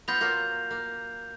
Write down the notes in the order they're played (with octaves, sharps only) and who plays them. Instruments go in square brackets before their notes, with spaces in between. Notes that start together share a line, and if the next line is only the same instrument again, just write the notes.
[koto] B3 F4 [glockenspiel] G6 A#6 F7
[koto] F#3 A#3 F4
A#3